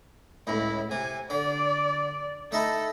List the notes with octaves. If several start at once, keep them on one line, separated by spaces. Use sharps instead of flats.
C#2 A2 E4
C3 G#5
D3 D5
A3 D#4 E4 A4